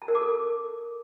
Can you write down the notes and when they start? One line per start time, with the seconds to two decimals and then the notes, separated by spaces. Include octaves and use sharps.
0.02 A5
0.08 A#4
0.15 D6
0.21 A4